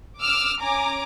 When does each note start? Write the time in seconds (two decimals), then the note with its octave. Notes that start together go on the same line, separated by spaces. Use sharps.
0.19 D6 E6 F6
0.59 C#4 G#5 A#5 D6